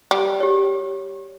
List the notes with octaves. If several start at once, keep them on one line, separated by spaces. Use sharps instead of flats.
G3
G4 C#5